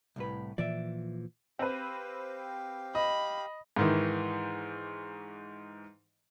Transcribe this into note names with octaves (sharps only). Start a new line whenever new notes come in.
C2 A2 B4
A#2 E3 F3 D5 E5
C4 G4 B4 F5 G5
D#5 B5
G#2 D#3 E3